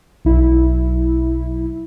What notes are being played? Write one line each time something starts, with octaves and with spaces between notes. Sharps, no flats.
B1 E4